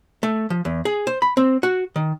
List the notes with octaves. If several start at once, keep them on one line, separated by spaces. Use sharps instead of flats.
A3
F3
E2
G#4
C5
B5
C4
F#4
D#3